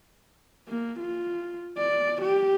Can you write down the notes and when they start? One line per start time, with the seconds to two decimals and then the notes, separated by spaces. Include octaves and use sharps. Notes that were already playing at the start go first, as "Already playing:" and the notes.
0.68 A#3
0.99 F4
1.78 D5
2.22 G4